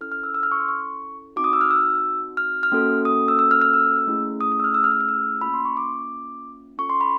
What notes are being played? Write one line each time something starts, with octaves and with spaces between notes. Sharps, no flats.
C#4 E4 A4 F6
F6
E6
E6
F6
C#6
C6
C#6
C4 D#4 F#4 D6
D#6
E6
F6
E6
F6
F6
A#3 C#4 F#4 A4
D#6
E6
E6
F6
F6
E6
A3 C#4 E4 G#4
D#6
D#6
E6
F6
E6
F6
E6
F6
E6
A#3 C#4 F4 B5
C6
C#6
D6
C#4 F4 A4 C#6
C6
B5